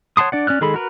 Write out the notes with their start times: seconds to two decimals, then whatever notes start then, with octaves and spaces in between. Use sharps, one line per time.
0.17 C#5 F#5 A5 C6 D#6
0.32 D4 D5 F#5
0.47 C#4 D5 F6 F#6
0.61 D#3 G#3 G#4 A4 B5
0.74 F#4 A#4 B4